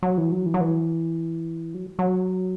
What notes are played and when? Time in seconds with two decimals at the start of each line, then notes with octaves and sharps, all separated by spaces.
0.03 F#3
0.18 E3
0.32 F#3
0.46 E3
0.54 F#3
0.61 E3
1.74 F#3
1.99 F#3